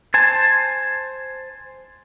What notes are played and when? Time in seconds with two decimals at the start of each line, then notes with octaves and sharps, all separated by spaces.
0.14 C5 G#5 A5